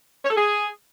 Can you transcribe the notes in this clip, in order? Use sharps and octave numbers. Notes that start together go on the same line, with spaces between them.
C#5
A4
G#4